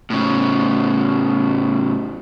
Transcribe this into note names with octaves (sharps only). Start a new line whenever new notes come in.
A2 C#3